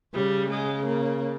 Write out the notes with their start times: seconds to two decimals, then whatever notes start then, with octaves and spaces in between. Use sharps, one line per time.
0.14 C#3 G3
0.50 G#3
0.86 A#3